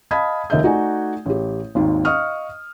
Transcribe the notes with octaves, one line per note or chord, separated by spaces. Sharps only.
D#5 F5 A5 B5 D#6 G#6
F1 D#2 A#4 D#5 E5 G6
A3 D#4 F#4 D5 F#5 G#5
A1 G4
G#1 D#2 D#3
D#5 F5 C#6 D#6 F6